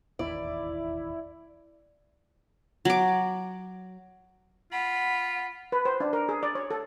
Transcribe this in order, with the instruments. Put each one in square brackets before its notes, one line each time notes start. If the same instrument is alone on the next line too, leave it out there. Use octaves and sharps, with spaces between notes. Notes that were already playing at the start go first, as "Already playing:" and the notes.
[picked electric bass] E1 A1 D#2 [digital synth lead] E4 [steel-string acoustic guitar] D5
[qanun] F#3 D6
[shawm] F4 [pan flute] F#5 [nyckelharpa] B5
[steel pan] B4
C5
D4
A#4
G#4
D5
C#5
A4